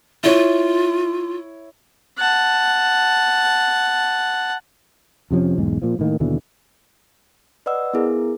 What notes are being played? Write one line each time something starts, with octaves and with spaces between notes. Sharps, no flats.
E4 F4 C#5
F#5 A5
F2 C3 F3 C#4
B1 E2 G#2 G#3
A#2 F3
A2 D#3 A#3
D#2 B2 D3 E3
B4 D5 D#5 F#5 E6
B3 E4 G#4 A#4